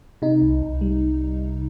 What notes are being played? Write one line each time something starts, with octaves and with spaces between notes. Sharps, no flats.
C3 D#4
C2
C2
G3